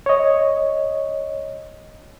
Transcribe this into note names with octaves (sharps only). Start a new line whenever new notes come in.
C#5 D#5